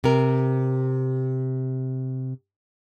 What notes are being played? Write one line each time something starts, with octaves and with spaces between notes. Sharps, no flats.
C3 A#4